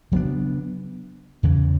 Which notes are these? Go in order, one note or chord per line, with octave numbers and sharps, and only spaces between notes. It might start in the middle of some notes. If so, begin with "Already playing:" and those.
C#3 F#3 B3 D4
E2 C#3 E3